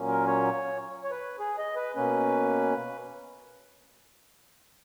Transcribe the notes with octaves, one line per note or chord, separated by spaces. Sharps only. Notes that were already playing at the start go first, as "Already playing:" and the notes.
Already playing: A#2 F#3 A#3 C#4
A#4
C#5
C#5
B4
G#4
D#5
B4
B2 A#3 C#4 B4